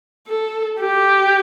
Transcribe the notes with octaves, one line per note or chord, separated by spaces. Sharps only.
A4
G4